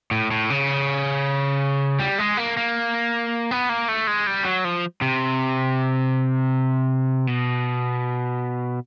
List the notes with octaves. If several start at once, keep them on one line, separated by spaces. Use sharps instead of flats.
A2
A2
C#3
G3
G#3
A#3
A#3
B3
A#3
A3
G#3
G3
F#3
F3
C3
B2